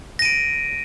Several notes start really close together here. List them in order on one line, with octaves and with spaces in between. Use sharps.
A#6 D#7 D7